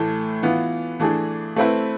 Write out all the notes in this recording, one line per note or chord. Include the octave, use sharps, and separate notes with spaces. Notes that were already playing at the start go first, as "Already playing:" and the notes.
Already playing: A2 E3 A3
E3 B3 F4
E3 A3 D4 G#4
A3 C4 E4 B4